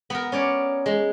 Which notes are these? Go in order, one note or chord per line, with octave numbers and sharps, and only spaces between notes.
B3 A#4
C#4 C#5 D5
G#3